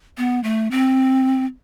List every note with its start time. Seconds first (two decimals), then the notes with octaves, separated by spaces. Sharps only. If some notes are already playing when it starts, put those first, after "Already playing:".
0.18 B3
0.44 A3
0.71 C4